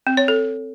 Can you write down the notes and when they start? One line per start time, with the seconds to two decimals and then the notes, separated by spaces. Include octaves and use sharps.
0.07 C4
0.17 C#5
0.28 A4